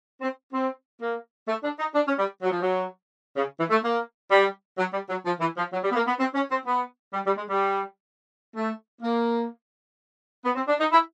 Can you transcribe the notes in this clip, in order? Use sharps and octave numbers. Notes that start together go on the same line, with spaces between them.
C4
C4
A#3
A3
D4
D#4
D4
C#4
G3
F#3
F3
F#3
C#3
E3
A3
A#3
G3
F#3
G3
F#3
F3
E3
F3
F#3
G3
B3
A#3
B3
C4
C#4
C4
B3
G3
G3
G#3
G3
A3
A#3
B3
C4
D4
D#4
E4